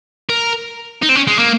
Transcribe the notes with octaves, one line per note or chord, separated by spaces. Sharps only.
A#4
D#4
C4
C#4
G#3
A#3